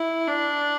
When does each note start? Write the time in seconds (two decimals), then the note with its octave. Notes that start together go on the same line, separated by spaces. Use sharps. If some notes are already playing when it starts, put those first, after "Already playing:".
Already playing: E4
0.27 D4